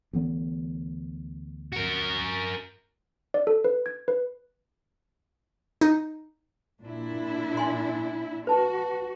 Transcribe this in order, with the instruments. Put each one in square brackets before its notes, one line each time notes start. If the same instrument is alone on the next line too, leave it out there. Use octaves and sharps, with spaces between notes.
[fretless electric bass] D2 E3 B3
[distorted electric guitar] F#4 A#4
[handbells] D5
A4
B4
G#6
B4
[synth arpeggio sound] D#4
[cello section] A#2 D4 E4
[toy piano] G#5 C6
[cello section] F#4 [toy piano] B4 A5